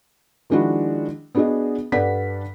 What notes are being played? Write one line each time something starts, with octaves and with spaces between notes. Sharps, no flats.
D#3 F3 G#3 D4 E4 F#4
B3 D4 F#4 G#4 B4 D#5
G2 A4 D5 F#5 B6